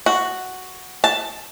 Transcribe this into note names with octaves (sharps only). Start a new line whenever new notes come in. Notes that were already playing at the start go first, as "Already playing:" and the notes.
F#4
A5